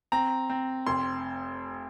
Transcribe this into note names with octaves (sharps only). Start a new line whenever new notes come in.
C4 A#5
C4
F1 C6